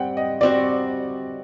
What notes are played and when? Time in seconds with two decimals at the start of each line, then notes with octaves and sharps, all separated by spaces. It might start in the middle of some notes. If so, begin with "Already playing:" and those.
Already playing: G3 C4 F#5 G5
0.17 D#5
0.41 G3 C4 F#4 D5